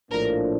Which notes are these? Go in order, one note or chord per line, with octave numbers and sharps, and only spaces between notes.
A#1 A2 F3 A#3 D4 A#4